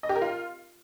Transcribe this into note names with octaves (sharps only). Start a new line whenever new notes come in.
D#5
G4
A#4
F4